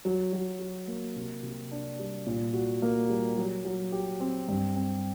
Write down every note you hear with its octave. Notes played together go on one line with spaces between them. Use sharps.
F#3
F#3
F#4
A#3
C3
C3
D4
G3
A#2
F#4
A#3
G3
F#3
F#3
G4
C4
G2
C4